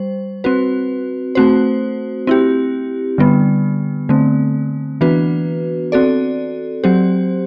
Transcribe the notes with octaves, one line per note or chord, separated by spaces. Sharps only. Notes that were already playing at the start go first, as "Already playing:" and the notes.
Already playing: G3 C5
C4 F#4 B4
A3 C4 F#4 C5
C4 E4 G4
D3 G3 B3
D3 A3 C4
E3 B3 D4 F#4 B4
C4 F#4 A4 D5
F#3 C4 G4 C5